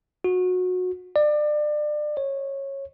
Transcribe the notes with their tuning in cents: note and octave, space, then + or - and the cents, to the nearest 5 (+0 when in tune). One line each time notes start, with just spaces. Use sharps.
F#4 -20
D5 +30
C#5 -15